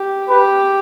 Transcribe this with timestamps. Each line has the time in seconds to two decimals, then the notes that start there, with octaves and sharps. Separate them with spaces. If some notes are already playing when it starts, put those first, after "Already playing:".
Already playing: G4
0.29 G4 B4